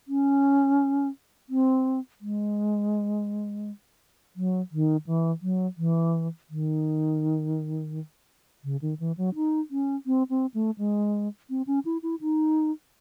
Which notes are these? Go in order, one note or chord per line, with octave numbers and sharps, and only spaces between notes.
C#4
C4
G#3
F#3
D#3
E3
F#3
E3
D#3
C#3
D#3
E3
F#3
D#4
C#4
C4
C4
A3
G#3
C4
C#4
E4
E4
D#4